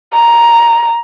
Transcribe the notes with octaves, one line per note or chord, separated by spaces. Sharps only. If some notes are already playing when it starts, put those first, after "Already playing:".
A#5